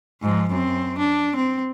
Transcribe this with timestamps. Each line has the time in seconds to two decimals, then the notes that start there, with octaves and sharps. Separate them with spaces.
0.21 G#2 F3
0.50 F#2 C4
0.98 D4
1.36 C4